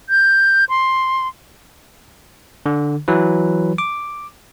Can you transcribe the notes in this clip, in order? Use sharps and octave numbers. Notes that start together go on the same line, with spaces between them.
G6
C6
D3
E3 F#3 B4
D6